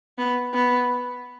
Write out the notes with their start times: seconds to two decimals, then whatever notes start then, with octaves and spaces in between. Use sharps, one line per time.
0.18 B3
0.54 B3